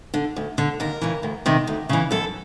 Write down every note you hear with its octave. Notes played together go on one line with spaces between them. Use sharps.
D3
D2
D3
D#2 A#4
C#3 E3
D2
C3 D#3
D2
C#3 E3
F#2 A4